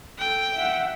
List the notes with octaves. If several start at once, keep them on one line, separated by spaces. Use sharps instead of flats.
A4 G5
E5 F#5